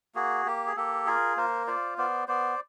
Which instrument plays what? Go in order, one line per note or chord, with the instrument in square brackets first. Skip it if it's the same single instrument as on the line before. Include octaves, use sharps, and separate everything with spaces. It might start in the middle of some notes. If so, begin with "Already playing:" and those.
[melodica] A#3 F#4 G#4
A#3 G4
G#4
A#3 G4 A4
F4 G#4 A#4
A#3 A#4 C5
F4 C5 D5
B3 C5 D5
B3 C5 D5